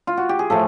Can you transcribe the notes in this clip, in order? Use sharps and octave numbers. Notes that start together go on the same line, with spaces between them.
F4
F#4
G4
G#4
A2 F3 A3 A4